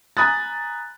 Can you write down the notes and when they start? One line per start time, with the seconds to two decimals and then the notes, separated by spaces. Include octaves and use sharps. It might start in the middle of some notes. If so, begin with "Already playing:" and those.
0.17 G#5 A#5 B5 D#6 F#6 A6